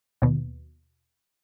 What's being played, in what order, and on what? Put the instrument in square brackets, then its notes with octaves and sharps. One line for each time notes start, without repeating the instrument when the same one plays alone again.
[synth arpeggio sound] D#2 B2